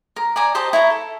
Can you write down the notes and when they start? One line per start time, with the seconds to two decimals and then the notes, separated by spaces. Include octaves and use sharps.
0.16 A#4
0.36 D5 G#5 A#5
0.55 G4 C5 D#5 A5
0.73 E4 C#5 A#5
0.90 A4